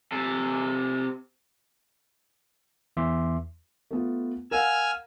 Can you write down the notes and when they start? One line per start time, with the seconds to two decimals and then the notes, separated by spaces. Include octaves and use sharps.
0.12 C3 A4
2.97 E2 E3 E5 C6 D6
3.91 A3 B3 F4
4.51 A#4 F5 F#5 G#5 E6 F6